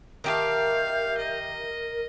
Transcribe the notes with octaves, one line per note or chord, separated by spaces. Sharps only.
D#3 G4 A#4 E5 F5 A5 G6
D#5